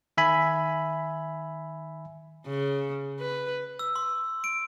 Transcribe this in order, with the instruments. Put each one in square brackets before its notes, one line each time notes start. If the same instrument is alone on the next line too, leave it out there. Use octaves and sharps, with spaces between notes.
[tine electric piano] D#3 E5 G#5 B5
[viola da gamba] C#3
B4
[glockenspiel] E6
C6
D7